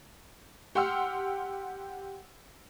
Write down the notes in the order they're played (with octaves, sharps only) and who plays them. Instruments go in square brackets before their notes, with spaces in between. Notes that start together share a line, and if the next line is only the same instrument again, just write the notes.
[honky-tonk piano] G4 F#5 G5 C6 E6 F6